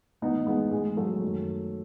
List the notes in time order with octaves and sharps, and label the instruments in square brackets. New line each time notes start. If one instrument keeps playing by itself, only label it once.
[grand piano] A2 B3 D#4
E3
G#3 B3
A2 E3 G#3
F#3 A3
F#2 D#3